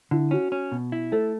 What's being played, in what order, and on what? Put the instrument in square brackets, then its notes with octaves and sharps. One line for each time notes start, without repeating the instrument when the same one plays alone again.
[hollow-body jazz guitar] D3 [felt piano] E4
[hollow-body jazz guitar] C#4 [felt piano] F#4
[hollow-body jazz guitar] C#4
B2
E4
[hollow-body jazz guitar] A3 [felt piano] A4